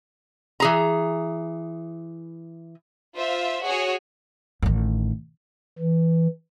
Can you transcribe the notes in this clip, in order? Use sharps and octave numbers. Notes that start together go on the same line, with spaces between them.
E3 G#4 A#5
F4 C5 E5
F#4 G#4 C#5
A1 D#3
E3